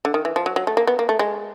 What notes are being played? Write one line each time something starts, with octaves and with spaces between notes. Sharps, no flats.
D3
D#3
E3
F3
F#3
F#3
A3
A#3
B3
A#3
A3
G#3